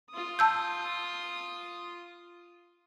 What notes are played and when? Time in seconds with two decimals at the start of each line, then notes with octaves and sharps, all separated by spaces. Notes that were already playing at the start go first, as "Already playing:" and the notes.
0.11 F4 D#6
0.39 A5 E6 G6